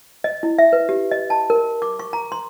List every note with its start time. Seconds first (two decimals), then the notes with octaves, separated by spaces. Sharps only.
0.24 D#5
0.43 E4
0.58 E5
0.73 B4
0.89 G4
1.11 D#5
1.30 A5
1.50 A#4
1.82 D6
1.99 C#6
2.13 A#5
2.32 C6